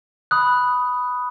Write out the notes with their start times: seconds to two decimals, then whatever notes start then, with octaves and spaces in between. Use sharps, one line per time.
0.31 B5 D#6 F#6